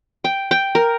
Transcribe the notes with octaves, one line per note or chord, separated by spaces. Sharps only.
G5
G5
A#4